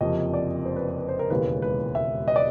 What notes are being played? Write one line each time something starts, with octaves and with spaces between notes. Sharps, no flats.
F#1 F2 C3 F3 D#5
D5
C5
B4
B4
B4
C5
A#4
E1 D#2 C#3 E3 G#3 B4
B4
E5
D#5
D5